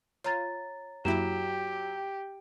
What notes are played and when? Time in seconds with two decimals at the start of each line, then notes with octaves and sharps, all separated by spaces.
0.24 F4 C#5 A#5 A6
1.05 F#2 F#3 A#3 E4 G4 E7